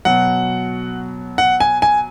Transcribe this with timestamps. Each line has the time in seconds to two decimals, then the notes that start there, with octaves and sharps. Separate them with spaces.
0.05 B2 F#3 F#5
1.38 F#5
1.60 G#5
1.82 G#5